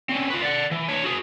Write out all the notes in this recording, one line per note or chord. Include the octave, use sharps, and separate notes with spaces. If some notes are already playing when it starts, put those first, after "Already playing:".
C4 C#4
F4 B4
D5 F#5
E3
D4 C#5
F#4 G#4